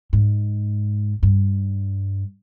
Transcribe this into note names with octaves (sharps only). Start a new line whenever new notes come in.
G#2
G2